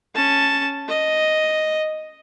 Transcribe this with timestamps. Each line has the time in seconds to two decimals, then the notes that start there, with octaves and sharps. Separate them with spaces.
0.15 C#4 A5
0.88 D#5